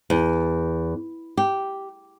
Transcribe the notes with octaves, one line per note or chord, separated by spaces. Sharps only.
E2
G4